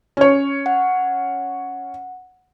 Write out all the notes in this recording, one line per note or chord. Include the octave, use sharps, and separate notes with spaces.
C#4 C#5
F#5